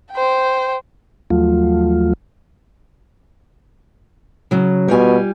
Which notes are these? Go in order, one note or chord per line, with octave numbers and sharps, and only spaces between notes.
C5 G5
D#2 F3 F#3 A3 F4
C#3 F#3
B2 G3 F4 G#5